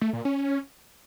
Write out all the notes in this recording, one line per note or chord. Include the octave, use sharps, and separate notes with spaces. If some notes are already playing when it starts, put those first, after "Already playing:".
A3
A#2
C#4